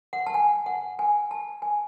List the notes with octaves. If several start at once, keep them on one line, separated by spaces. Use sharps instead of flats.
F#5
A5
G#5
F#5
G#5
A5
G#5